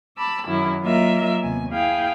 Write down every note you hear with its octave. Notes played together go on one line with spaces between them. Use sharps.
A5 B5 D6 E6
F#2 D#3 E4
F#3 A#3 F4 A#4 D#5 E5
D#2 C3 B3 G#5
E4 G#4 F5 G5 G#5